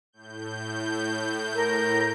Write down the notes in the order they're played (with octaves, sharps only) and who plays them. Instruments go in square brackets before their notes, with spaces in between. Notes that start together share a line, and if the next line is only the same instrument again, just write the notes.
[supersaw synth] A2 G6
[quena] A#4